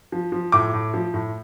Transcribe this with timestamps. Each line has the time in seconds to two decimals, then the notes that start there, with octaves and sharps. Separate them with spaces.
0.12 F3
0.32 F3
0.52 A2 D6
0.74 A2
0.94 F3
1.14 A2